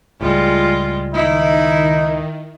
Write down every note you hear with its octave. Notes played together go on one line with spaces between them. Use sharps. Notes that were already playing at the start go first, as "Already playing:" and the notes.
C#2 A2 G3 G#3 F4
D#3 D#4 E4